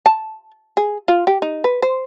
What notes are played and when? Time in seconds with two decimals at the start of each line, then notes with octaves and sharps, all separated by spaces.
0.06 A5
0.77 G#4
1.08 F4
1.27 G4
1.42 D#4
1.64 B4
1.82 C5